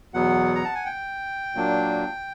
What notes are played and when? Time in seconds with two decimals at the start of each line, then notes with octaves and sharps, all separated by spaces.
0.14 E2 B2 F#3 B3 F#5
0.55 A#5
0.65 A5
0.75 G#5
0.85 G5
1.55 A#2 F#3 A#3 D4